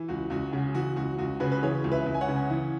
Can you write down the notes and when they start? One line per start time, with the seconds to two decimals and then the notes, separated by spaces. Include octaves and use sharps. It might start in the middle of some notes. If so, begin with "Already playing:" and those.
Already playing: E3
0.08 C#2 F#4
0.30 C#2 F#4
0.53 C#3
0.75 E3 F#4
0.96 C#2 F#4
1.18 C#2 F#4
1.40 C#3 F#4 B4
1.52 B4
1.63 E3 G#4 C#5
1.84 C#2
1.92 B4 E5
2.06 C#2
2.14 G#5
2.21 C#5 F#5
2.28 C#3
2.50 E3